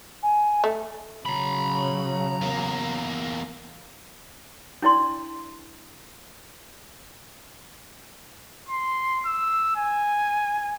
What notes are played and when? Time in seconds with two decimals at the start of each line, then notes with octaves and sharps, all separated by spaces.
0.23 G#5
0.64 A3
1.26 C#3 F#3 A#5 B5
2.41 E2 A#3
4.82 D4 E4 D5 C6
8.69 C6
9.26 E6
9.77 G#5